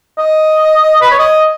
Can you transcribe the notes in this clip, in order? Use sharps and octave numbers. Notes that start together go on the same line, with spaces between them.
D#5
B4
C#5
D#5